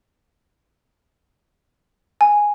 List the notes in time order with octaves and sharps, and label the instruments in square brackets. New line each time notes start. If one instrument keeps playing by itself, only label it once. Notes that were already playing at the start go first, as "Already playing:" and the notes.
[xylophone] G#5